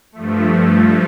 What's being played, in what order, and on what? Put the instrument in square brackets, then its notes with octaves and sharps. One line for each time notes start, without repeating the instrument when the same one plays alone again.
[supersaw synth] G2 F3 A3